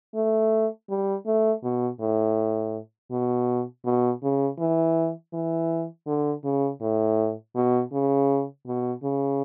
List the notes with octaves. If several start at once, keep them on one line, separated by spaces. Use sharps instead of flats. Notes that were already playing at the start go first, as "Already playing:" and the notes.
A3
G3
A3
B2
A2
B2
B2
C#3
E3
E3
D3
C#3
A2
B2
C#3
B2
C#3